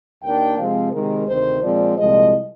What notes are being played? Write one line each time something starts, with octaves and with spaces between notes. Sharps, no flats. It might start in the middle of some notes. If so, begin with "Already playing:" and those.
D#2 D#3 A#3 D4 G5
C3 F3 G#3 C4 F5
C3 D#3 G#3 A#4
D2 C3 D#3 C5
A#2 F3 G#3 C4 D5
C2 A#2 F3 G#3 D#5